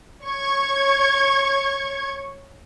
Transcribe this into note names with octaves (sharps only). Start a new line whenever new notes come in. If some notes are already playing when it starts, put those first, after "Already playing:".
C#5 C#6 G#6